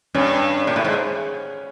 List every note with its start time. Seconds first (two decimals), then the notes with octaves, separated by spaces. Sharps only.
0.14 G2 C#4
0.67 A#2
0.76 A2
0.84 G#2